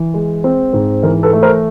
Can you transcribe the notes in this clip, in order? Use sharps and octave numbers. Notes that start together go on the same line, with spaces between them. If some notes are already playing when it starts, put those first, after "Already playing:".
Already playing: E3
G#3
C4
G#2
E3 A#4
A4 B4
A3
A#4 C5